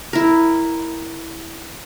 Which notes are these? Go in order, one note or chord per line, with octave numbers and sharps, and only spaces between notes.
E4 A#4